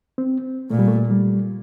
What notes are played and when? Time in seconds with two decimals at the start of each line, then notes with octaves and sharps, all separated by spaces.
0.18 C4
0.70 A#2 A3
0.79 G3
0.88 A3
1.11 G3